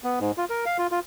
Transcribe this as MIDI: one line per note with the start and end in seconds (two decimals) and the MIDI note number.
0.04 0.19 59
0.20 0.31 44
0.38 0.45 65
0.50 0.65 70
0.66 0.77 77
0.78 0.87 65
0.91 1.00 65